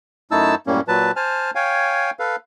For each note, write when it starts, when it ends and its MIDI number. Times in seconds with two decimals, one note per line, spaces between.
0.31 0.55 42
0.31 0.55 57
0.31 0.55 63
0.31 0.55 64
0.31 0.55 81
0.31 0.55 88
0.67 0.81 42
0.67 0.81 45
0.67 0.81 55
0.67 0.81 58
0.67 0.81 61
0.88 1.11 46
0.88 1.11 54
0.88 1.11 71
0.88 1.11 81
1.16 1.51 72
1.16 1.51 80
1.16 1.51 81
1.16 1.51 89
1.55 2.11 73
1.55 2.11 77
1.55 2.11 79
1.55 2.11 80
2.19 2.36 69
2.19 2.36 71
2.19 2.36 77